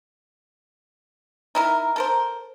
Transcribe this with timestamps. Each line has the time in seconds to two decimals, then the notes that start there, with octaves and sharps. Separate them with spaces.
1.55 D#4 E4 A#4
1.96 A4 A#4 C5